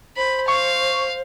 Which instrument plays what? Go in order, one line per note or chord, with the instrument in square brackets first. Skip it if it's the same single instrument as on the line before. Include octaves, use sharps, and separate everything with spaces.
[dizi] C5 [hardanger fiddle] B5
[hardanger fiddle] F5 [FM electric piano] C#6